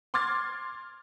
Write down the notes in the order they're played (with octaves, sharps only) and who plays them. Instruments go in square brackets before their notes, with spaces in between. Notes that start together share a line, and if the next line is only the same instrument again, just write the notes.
[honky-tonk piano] C6 D6 F6 G#6 A6